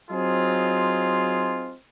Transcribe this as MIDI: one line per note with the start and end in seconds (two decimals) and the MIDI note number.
0.11 1.75 54
0.11 1.75 60
0.11 1.75 63
0.11 1.75 65
0.11 1.75 68